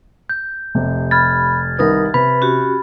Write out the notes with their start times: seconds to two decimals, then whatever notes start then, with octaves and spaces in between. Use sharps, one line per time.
0.29 G6
0.75 F1 C3
1.11 B5 F6 G#6 A6
1.79 C2 D#3 A#4 B4 D#6
2.14 C3 B4 B5
2.41 C#4 F#4 G4